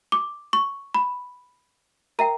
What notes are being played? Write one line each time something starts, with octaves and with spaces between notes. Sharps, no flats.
D6
C#6
B5
A#4 E5 G5 A#5